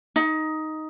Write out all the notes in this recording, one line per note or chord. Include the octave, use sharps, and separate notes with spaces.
D#4